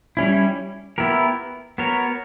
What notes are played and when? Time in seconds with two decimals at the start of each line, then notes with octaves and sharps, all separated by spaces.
0.17 G3 C#4 E4
0.98 B3 E4 G4 A#4
1.78 B3 F#4 A#4 C#5